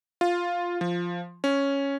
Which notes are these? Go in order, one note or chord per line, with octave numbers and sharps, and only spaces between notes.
F4
F3
C#4